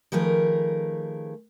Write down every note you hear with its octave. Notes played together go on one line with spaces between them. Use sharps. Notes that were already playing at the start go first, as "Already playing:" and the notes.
D#3 F3 A3 G#4 A#4 B4